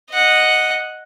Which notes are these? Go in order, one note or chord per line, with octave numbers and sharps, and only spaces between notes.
D#5 F#5